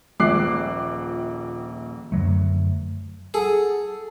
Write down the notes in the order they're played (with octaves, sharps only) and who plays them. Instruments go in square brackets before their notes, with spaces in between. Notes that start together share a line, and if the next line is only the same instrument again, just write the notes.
[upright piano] D#1 A#1 D6 F#6 C7
[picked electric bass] F#2 D3 F#3 A3
[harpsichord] G#4 [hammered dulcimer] A4